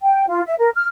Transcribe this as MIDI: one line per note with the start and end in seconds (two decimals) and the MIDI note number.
0.01 0.25 79
0.28 0.41 65
0.46 0.54 76
0.59 0.69 70
0.75 0.87 89